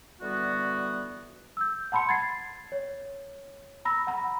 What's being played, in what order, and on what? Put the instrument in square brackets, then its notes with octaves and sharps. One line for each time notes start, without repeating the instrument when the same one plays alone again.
[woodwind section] D3 E3 G3 B3 F#4
[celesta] E6 G6
F#5 A5 B5 C6 C#7
G#6 A6 C7
C#5
A#5 B5 E6 A#6
F#5 A#5 B5